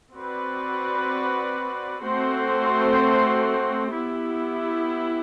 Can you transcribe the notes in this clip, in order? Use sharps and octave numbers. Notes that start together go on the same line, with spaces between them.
C4 F#4 B4 D5
A3 C4 F#4 C5
B3 E4 G4